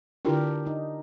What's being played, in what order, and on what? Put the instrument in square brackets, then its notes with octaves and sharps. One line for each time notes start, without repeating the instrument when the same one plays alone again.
[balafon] D3 E4 F4 [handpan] D4 G4 A#4
[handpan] D#4